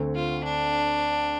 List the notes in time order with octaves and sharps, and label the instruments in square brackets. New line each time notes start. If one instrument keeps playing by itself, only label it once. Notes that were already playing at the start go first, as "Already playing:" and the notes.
Already playing: [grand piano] D2 D3 A3 C4
[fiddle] F4
D4